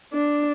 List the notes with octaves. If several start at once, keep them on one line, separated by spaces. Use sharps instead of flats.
D4